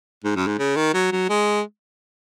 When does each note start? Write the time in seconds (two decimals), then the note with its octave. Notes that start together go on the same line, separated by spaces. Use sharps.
0.24 G#2
0.36 F#2
0.47 G#2
0.59 C#3
0.76 D#3
0.94 F#3
1.12 F#3
1.29 G#3